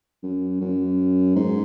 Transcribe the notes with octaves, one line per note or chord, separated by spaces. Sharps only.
F#2
F#2
G#2